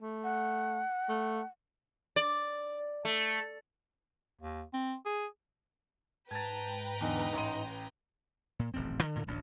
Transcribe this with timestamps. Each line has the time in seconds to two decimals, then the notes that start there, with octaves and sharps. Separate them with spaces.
0.02 A3
0.24 F#5
1.09 A3
2.16 D5
3.05 A3
4.40 D#2
4.73 C4
5.06 G#4
6.31 G#2 B4 G5 A5 A#5 G#6 A6
7.01 E2 D3 D#4
7.33 A1 C6 D#7
8.59 A#2
8.74 D#1 A1 F#2 C4
9.03 D3
9.15 D2 A2 D3
9.27 D1 A1 D2 D4